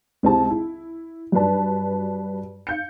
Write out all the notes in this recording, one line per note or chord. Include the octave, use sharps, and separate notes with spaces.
C#2 C3 C4 E4 G#4 A5
E4
G2 F#3 D4 B4 A5
F5 G6 C#7